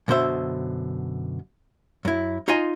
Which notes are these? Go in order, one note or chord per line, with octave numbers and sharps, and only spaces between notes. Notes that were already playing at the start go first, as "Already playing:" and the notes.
F#2 B2 D3 C5 E5
F#2 E4
D#4 F4 D#5 G#5 C6